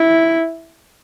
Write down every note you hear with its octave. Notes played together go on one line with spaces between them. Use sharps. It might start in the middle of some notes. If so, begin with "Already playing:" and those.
Already playing: E4